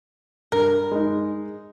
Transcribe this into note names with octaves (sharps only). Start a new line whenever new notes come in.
G2 A#4
G#3 D#4